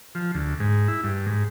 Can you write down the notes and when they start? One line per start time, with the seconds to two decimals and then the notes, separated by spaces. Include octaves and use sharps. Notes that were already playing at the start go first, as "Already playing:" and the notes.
0.15 F3
0.35 D2
0.60 G#2
0.88 E4
1.04 G2
1.26 G#2